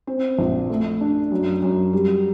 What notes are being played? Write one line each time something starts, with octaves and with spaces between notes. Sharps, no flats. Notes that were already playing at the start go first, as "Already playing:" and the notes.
C4
A#1
A3
D4
F#2
F#2
G3